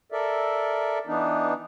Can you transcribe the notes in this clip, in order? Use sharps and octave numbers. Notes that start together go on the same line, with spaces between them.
A4 A#4 D5 E5
E3 B3 D4 D#4